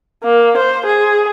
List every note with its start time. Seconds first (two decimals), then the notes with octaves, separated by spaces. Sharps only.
0.24 A#3
0.57 C5
0.85 G#4